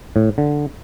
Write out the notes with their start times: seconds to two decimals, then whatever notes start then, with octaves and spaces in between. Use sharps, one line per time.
0.16 A2
0.38 D3